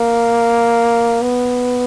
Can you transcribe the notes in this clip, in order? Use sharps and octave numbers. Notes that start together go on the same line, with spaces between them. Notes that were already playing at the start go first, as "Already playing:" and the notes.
Already playing: A#3
B3